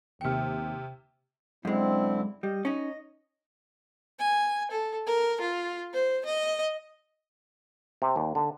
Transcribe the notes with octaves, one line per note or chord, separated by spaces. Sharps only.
D#2 C3 G5 F6 C#7
F#2 D3 G#3 C4 E4
G3 D#5
C#4 D#4
G#5
A4
A#4
F4
C5
D#5
C3
D#2
D3